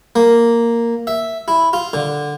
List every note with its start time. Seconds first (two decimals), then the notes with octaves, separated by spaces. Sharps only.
0.16 A#3
1.07 E5
1.48 E4
1.73 F4
1.93 D3